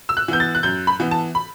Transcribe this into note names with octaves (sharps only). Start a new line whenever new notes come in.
E6
F#6
E3 B3 G6
A6
F#6
F#2 G6
B5
E3 B3
A5
B5